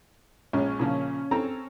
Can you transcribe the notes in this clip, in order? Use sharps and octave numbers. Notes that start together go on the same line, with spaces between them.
A#1 G#3 C#4
A#2 C#3 F3
C4 A4 A#5